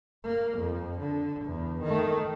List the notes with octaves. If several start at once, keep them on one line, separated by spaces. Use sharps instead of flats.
A#3
F2
D3
E2
D#3 A3